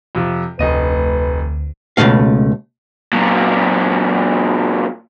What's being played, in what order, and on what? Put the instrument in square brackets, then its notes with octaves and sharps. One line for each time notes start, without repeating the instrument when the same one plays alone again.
[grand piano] F2 C3 F3
[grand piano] F1 D#5 D#7 [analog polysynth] D2 [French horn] B4
[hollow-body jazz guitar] C#2 G#2 B2 A3 F5
[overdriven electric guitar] A#2 F#3